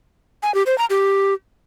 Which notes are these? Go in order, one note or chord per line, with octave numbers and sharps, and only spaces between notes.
G#5
G4
C5
A#5
G4